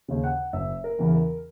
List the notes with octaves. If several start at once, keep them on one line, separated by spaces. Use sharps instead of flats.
D#2 C#3
F#5
F#1 E5
A#4
E2 C#3 E3
A#4